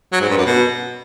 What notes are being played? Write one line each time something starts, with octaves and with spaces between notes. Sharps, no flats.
F#3
G#2
G2
F#2
B2